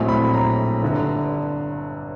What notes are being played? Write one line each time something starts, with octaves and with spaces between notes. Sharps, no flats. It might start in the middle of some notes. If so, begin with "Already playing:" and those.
Already playing: A#1 A2 F#3 A3 C4
B5
A#5
G1 G2 D3